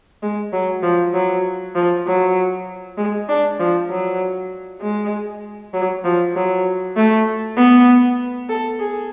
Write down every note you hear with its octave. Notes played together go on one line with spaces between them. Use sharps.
G#3
F#3
F3
F#3
F3
F#3
G#3
D4
F3
F#3
G#3
F#3
F3
F#3
A3
B3
A4
G#4